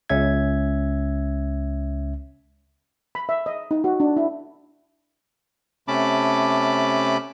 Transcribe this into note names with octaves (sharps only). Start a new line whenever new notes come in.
C#2 C#4 E5 G#6
B5
E5
D#5
D#4
F#4
D4
E4
C3 A3 C#4 A5 B5 D6